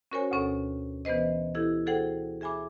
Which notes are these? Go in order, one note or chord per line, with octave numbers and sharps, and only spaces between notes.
C#4 F#4 A#4 C5 C#5 G#5
D2 B2 C#4 A4
E3 B3 B4 C5 D#5
E4 G4 A4 G#6
F#4 G#4 A4 C5 F#5 G5
G#4 E5 G#5 B5 D6